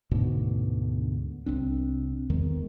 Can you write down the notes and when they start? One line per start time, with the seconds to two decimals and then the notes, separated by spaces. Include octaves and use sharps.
0.11 D2 G#2 B2 D3
1.46 C2 C4 D4
2.30 E2 D#3 G#3